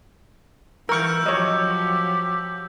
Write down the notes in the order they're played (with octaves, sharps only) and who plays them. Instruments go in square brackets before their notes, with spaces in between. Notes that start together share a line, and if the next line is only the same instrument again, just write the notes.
[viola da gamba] E3 [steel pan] A#4 C#6 [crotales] E6 G6
[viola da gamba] F3 F#3 [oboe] G4 [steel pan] C#5 D#5